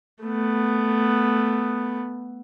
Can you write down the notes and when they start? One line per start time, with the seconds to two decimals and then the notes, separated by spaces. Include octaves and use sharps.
0.24 A3 B3